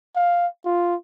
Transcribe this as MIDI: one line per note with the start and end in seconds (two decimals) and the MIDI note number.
0.16 0.47 77
0.65 0.95 65